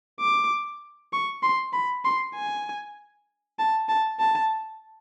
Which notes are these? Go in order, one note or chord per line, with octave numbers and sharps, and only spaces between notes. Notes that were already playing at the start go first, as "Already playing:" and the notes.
D6
C#6
C6
B5
C6
G#5
A5
A5
A5